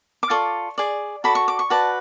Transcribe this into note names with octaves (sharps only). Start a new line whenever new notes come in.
D6
F4 A4 D5 C#6
G#4 D5
F#4 A4 D5 B5
C#6
D6
C#6
F#4 B4 D5 A5